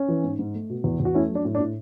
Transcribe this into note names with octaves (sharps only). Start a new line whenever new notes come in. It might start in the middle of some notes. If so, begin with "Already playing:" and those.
Already playing: C#4
E3
G#2
G#2
A3
B2
E2
E2
F#4
A3 C#4 E4
F#3
D4
A2
D4
A2